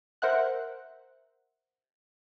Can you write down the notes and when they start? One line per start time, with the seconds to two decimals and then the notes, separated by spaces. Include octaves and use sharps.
0.22 A#4 C5 E5 F#5 F#6